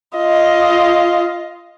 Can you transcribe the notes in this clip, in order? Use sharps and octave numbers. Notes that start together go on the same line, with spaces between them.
F4 D#5